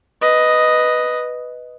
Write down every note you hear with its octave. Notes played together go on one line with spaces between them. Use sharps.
B4 D#5